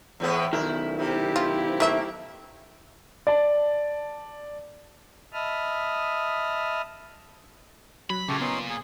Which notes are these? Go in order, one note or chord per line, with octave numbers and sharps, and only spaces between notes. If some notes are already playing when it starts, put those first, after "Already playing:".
E2 A2 B3
B1 G#2 D#3 E4
C3 E4 G4
F4
A3 A#3 E5
D5 A5
D#5 E5 A5 B5 D#6 F6
F#3 B5
A#2 C#3 A3 G4
B3 C#4 D#4 C6
G#4